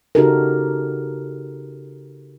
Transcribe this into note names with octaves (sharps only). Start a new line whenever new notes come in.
C#3 D#4 F#4 G4 A4 A#4